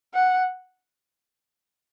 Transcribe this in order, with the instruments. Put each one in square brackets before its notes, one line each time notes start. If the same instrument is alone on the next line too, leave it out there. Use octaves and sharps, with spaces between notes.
[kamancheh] F#5